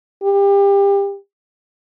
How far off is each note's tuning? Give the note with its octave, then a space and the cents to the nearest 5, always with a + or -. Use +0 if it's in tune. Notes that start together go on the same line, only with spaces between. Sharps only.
G4 +25